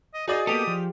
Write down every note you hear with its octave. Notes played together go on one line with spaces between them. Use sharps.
D#5
D#4 F#4 G#4 D5 D#5
A#3 B3 G4 A4 D#6
F3